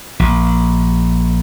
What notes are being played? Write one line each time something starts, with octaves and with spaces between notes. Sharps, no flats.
A#1